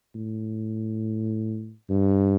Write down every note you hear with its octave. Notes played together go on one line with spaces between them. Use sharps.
A2
G2